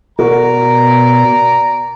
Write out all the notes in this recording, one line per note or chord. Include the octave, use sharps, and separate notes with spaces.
B2 F#4 A#4 D5 A#5